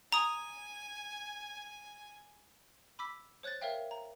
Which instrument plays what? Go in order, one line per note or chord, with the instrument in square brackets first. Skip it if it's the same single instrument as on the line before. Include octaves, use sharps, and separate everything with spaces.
[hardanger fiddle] G#5 [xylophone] A#5 D#6
[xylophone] B5 D6 E6 B6
C5 C#5 F#6 G#6 A6
A#4 C#5 E5 F5 G5
A#5